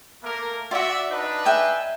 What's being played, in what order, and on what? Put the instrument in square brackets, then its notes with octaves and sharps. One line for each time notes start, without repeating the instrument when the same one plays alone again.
[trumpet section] A3 A#3 A#4
[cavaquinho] F4 F#4 [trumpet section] D5 E5
[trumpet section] D4 D#4 B4
[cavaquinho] E5 G5 G#5